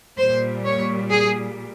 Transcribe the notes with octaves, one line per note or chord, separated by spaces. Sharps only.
A#2 G3 C5
C#5
G#4